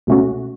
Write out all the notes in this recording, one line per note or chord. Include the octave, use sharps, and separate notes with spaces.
C#2 B2 A3 C#4 F#4